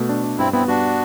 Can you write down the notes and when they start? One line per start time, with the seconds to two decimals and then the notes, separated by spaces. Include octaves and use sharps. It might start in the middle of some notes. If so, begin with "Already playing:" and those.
Already playing: B2 A3
0.09 D4
0.24 D4
0.38 G2 C4 E4
0.53 B3 C4 E4
0.68 G2 D4 F#4